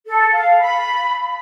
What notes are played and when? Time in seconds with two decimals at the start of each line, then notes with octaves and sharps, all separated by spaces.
0.07 A4
0.33 F5
0.60 B5